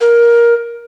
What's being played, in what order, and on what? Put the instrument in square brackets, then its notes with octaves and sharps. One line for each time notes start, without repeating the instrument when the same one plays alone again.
[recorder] A#4